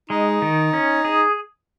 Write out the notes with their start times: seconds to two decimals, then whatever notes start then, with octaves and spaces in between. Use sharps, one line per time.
0.10 G#3 D#4
0.42 D#3
0.73 C#4
1.05 G#4